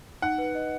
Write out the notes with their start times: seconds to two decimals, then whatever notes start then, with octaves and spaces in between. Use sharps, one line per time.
0.22 D#4 F#5
0.38 B4
0.55 D#5